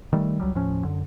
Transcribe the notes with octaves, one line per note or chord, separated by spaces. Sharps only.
D#3 G3 A3
C#2 F#3 G3
D#2 A2 F3 C#4
F#2 D3